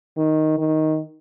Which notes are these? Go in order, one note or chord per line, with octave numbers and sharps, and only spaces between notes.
D#3
D#3